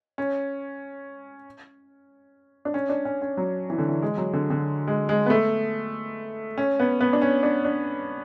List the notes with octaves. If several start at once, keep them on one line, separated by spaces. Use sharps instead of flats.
C#4
D4
C#4
D4
C#4
C#4
F#3
E3
D3
E3
G#3
F#3
D3
D3
G#3
G#3
B3
A3
C#4
B3
B3
D4
C#4
D4
D4